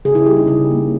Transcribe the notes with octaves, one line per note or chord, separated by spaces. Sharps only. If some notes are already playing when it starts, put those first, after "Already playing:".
C#3 G#4
E4
G3 A#3 C#4 G4
D#4
C#3 E4
G3 A#3 C#4